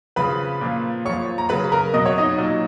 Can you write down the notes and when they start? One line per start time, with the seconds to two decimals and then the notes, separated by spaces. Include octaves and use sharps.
0.16 C#3 F3 B4 B5
0.61 A#2 F3
1.05 A#2 F3 C#5 C#6
1.38 A#5
1.49 C#3 F#3 B4 B5
1.72 A#4 A#5
1.94 B2 F#3 D#5
2.06 C#5
2.18 D#4 D#5
2.39 A#2 F#3